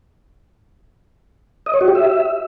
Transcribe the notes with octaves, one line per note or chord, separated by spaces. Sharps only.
D#5
C#5
F#4
G4
E5